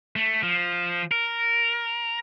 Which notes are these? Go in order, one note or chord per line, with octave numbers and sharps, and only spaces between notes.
A3
F3
A#4